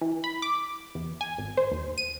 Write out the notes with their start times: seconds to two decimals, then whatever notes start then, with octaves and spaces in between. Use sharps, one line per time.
0.01 E3
0.24 B5
0.42 D6
0.95 E2
1.21 G#5
1.38 G#1
1.57 C5
1.72 D#2
1.98 D#7